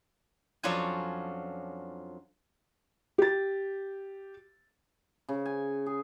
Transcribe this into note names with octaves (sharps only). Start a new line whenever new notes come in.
F2 F#3 C#4 D4 F4 G#5
G4 A6
C#3
G#5
G#4